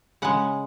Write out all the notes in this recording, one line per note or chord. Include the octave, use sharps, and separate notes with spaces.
C#3 G#3 F#5